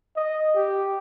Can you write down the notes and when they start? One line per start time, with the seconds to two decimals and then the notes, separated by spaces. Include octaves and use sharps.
0.16 D#5
0.55 G4